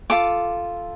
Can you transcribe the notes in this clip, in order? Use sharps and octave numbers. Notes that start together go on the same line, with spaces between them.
F4 A4 D6